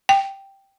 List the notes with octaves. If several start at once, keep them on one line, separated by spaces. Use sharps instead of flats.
G5